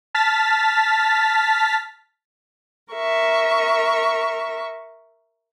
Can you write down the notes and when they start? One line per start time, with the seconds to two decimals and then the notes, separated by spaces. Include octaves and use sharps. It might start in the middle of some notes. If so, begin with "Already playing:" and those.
0.14 A5 F6 A6 B6
2.93 A#4 E5 C#6